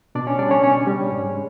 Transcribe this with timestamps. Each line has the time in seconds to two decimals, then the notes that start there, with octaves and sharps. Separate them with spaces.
0.15 B2 D4 D5
0.27 C#4 C#5
0.39 G3 D4 D5
0.51 C#4 C#5
0.63 B2 C#4 C#5
0.87 G3
1.11 G#2
1.34 G#3